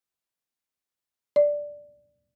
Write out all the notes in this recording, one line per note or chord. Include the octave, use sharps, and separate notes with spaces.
D5